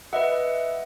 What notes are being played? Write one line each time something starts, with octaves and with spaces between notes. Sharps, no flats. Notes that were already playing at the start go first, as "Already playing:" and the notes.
B4 D#5 E5 F#5